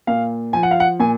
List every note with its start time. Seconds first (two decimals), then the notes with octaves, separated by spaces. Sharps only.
0.07 A#2 F5
0.53 F3 G#5
0.63 F#5
0.71 F5
0.80 F#5
1.00 A#2 G#5